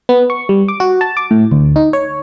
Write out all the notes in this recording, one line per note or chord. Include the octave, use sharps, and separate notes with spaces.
B3
C#6
G3
D6
F#4
A5
D6
A2
D2
D#4
C#5